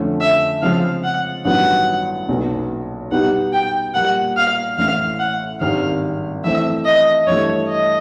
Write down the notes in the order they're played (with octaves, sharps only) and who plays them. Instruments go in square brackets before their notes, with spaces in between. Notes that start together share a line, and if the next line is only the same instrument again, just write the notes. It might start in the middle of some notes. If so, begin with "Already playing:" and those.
Already playing: [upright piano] F2 D3 F3 A3 C#4
[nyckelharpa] E5
[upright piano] C#3 F3 G#3 C4 F4 [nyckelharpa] F5
[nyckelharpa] F#5
[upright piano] A1 G2 D#3 F#3 B3 [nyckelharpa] F#5
[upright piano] B1 A#2 F#3 B3
[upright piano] B2 G3 B3 D#4 G4 [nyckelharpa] F#5
[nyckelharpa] G5
[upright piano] A#2 G3 A#3 [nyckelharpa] F#5
[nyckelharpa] F5
[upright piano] A1 A2 E3 [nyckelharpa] F5
[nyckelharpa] F#5
[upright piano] G#1 G2 D#3 G3 C4 [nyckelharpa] F5
[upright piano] E3 A3 C4 [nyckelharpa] E5
[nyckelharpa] D#5
[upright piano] G2 E3 A3 [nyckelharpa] C#5
[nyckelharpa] D#5